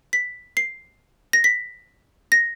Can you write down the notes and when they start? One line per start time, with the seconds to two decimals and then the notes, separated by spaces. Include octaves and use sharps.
0.13 B6
0.57 C7
1.33 A#6
1.44 B6
2.32 A#6